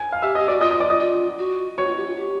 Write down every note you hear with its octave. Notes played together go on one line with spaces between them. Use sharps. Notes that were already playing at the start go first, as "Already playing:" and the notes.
Already playing: G#5 G#6
F5 F6
G4 E5 E6
G4 D#5 D#6
F#4 D5 D6
F4 D#5 D#6
D#5 D#6
D5 D6
D#5 D#6
F4
F#4
F#4 C#5 C#6
F4
G4
F4
G4